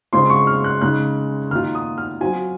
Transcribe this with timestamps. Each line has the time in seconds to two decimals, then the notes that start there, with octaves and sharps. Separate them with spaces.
0.13 C#3 G#3 C4 F4 C6
0.30 C#6
0.47 F6
0.64 F#6
0.82 C#3 G#3 D#4 F#6
1.51 D#3 A#3 F4 F6
1.75 D#6
1.98 F6
2.21 F#3 C4 F4 G#5